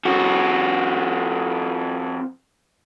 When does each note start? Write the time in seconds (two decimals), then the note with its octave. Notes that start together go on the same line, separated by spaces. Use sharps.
0.05 F2 F#4